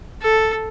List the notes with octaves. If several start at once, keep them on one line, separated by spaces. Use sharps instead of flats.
A4